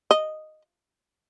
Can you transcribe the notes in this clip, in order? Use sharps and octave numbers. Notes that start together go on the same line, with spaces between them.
D#5